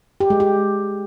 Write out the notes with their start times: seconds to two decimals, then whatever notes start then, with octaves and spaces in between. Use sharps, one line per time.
0.20 G4
0.30 G#3
0.40 G4